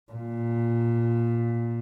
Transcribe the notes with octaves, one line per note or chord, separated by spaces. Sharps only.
A#2